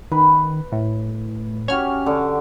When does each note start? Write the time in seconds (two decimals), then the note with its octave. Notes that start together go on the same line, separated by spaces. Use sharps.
0.12 D#3 B4
0.72 A2
1.68 C#4 F#4 G4 C#5 F6
2.06 D3